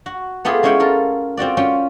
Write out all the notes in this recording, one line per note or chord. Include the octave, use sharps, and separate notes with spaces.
F#4
A3 B3 F4 G4 G#4
G#3 C#4 E4 C#5 F#5 G5
F4 A4 A#4
C4 F4 F#4 D5
C#4 F4 G5